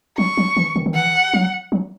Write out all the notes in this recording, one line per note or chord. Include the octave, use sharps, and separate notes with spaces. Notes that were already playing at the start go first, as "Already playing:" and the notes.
F#3 C#6
F#3
E3
D#3
D#3
E3 F#5
F#3
F#3